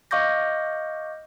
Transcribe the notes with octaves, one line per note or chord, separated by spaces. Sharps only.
D#5 F5 C#6 D6 G6 A#6